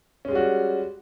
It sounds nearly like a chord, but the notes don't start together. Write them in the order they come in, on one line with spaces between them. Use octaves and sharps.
C#4 G#3 G3 F#4